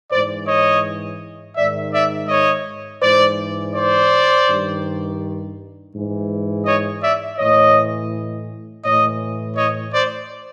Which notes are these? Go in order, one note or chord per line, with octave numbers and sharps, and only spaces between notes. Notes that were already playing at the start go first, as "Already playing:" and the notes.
G#2 E3 C5 D5
C#5 D#5
G#2 D#3 D5 E5
D5 E5
C#5 D#5
G#2 E3 C5 D5
C5 D5
G2 D#3
G#2 E3
C#5 D#5
D5 E5
A2 E3 C#5 D#5
A2 E3 C#5 D#5
C#5 D#5
C5 D5